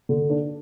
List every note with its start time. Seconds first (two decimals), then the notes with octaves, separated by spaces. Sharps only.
0.09 D3
0.30 D4